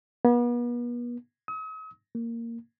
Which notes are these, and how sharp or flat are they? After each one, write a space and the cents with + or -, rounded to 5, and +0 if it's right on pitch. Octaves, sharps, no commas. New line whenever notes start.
B3 -40
D#6 +45
A#3 -10